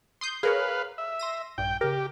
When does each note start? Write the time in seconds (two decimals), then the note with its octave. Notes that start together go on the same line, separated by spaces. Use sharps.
0.21 C6 D#6 G6
0.43 G#4 A#4 B4 C#5 F5
0.98 E5
1.19 C6 A#6 D#7
1.58 A#1 G2 G5
1.81 C#3 G4 A#4